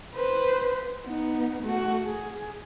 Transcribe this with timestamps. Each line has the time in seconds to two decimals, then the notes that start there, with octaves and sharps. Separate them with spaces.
0.15 B4 C5
1.06 B3 D#4
1.63 A3 F#4
2.06 G#4